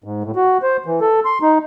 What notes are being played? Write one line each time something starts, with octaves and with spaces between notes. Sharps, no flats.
G#2
A2
F#4
C5
E3
A4
C6
D#4